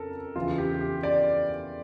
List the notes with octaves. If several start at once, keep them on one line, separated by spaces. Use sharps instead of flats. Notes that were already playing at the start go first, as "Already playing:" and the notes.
Already playing: F2 C#3 A4 A#4
E2 C#3 E3 F4
G4
G4
D5